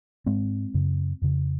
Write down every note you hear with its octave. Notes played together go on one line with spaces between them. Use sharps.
G#2 G#3 C4
F#2 C#3
F2 C#3